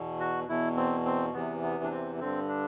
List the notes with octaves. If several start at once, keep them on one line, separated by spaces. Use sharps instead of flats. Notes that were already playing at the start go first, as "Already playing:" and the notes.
Already playing: E2 B2
F#4
E2 B2 E4
C4
C4
E2 C3 E3 B3
B3
D4
C4
G2 D3 C4
D4